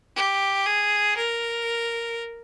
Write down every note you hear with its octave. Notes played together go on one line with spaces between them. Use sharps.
G4
G#4
A#4